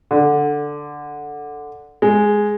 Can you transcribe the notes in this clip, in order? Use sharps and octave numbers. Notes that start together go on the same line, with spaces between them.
D3
G#3